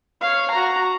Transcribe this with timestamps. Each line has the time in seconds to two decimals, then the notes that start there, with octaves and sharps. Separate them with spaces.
0.21 C#5 F5
0.51 F#4 A#5